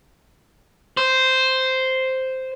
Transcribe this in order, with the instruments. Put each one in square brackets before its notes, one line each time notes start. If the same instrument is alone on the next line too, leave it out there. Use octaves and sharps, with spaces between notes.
[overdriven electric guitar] C5